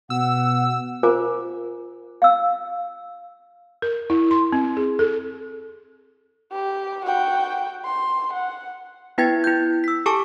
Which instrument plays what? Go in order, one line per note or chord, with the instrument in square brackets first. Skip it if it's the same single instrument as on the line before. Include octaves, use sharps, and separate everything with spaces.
[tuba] B2 [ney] F#5 [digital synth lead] E6
[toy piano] F4 A#4 C5 G#5 D6
F5 E6
[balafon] A#4
E4
C6
C4
G#4
A4
[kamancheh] G4
F#4 G5
C6
F#5
[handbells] B3 E4 B4 G5 G#6 A6
E4 G6
E6 B6
G4 A4 G#5 A5 C#6 D6